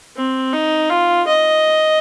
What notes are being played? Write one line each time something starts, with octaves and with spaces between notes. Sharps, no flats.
C4
D#4
F4
D#5